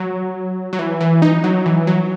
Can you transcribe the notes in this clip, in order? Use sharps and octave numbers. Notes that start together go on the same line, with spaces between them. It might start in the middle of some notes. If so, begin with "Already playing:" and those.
Already playing: F#3
F#3
E3
E3
D#4
F#3
E3
F#3